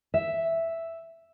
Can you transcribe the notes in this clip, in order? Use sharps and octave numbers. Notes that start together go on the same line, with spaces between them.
E5